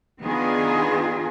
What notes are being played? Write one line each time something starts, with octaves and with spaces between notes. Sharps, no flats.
D#3 B3 D4 F4 G#4